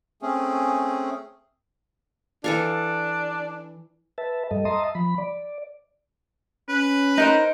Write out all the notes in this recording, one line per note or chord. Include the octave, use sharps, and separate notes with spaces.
A3 C4 C#4 G#4
E3 D4 A4 F5
B4 E5 A5
G2 G3 A4 D#5
D#5 E5 A5 A#5 C6 D#6
F3 B5
D5
C#4 B4
D#4 A#4 C5